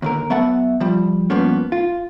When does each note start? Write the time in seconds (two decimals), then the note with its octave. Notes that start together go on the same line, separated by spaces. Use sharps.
0.02 D#2 D3 A#4
0.30 F#3 B3 E5 F#5 A5
0.80 F3 G3
1.30 G2 F3 A#3 B3 C#4
1.72 F4